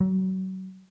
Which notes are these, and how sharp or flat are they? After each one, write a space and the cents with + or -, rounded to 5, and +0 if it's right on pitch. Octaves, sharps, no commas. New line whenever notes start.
F#3 +30